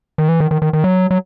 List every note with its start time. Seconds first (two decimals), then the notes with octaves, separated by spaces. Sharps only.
0.18 D#3
0.29 E3
0.40 D#3
0.51 D#3
0.62 D#3
0.73 D#3
0.84 F#3
1.11 F#3